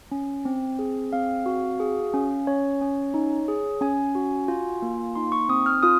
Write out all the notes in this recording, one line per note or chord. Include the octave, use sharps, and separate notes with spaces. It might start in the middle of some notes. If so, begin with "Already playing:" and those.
C#4
C4
G#4
C4 F5
F#4
G#4
C#4
C#4 C#5
C#4
D#4
G#4
C#4 G#5
F#4
F4
A#3
D#4 C6
C#6
C4 D#6
F6
F4 D#6